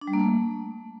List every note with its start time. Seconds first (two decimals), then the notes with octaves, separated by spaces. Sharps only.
0.01 D4
0.07 G3
0.13 A#3
0.19 A3